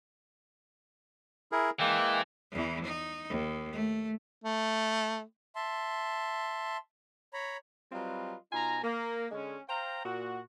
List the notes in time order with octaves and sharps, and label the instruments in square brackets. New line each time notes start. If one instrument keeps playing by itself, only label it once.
[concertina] E4 G#4 A#4
[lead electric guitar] E3 [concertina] G#3 A#3 G5
[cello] E2 E3
D#4
D#2
A3
[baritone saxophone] A3
[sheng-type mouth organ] E5 A5 C6
C#5 A#5 B5
[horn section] F#3 G3 C4 F4 B4 D#5
B2 D#4 F4 G#5 A#5
A#3
D3 G#3 C#4
C5 F5 G5 A#5
A#2 F#4